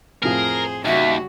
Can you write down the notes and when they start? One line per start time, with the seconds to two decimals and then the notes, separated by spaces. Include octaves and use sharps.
0.23 F2 A2 F3 G#4 A#4 C5
0.85 D#2 C#3 G3 F#4 E5